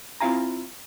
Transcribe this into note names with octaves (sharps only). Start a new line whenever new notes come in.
C4 E4 F4 F5 G#5 A#5